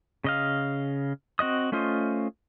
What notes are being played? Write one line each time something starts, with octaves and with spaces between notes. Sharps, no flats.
C#3 D#5 F5
C4 F#4 D#5 D#6
A3 C#4 F4 C5 D#5